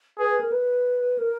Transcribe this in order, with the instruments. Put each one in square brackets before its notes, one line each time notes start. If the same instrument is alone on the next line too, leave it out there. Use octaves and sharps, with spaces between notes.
[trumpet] G#4 [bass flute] B4
[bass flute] B4
A#4
B4
A#4